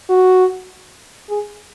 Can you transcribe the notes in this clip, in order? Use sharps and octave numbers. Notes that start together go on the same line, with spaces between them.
F#4
G#4